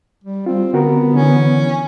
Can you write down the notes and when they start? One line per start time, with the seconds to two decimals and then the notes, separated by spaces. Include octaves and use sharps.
0.24 G3
0.46 G3 C4 F4
0.73 D3 B3 F#4 A#4
1.14 D3 E3 C#4